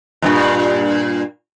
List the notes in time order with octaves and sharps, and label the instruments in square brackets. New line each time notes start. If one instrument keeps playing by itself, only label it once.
[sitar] E2 G2 A#2